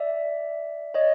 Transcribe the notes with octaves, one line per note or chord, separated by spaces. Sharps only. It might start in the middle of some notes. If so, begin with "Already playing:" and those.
Already playing: D5 E5
C#5 D#5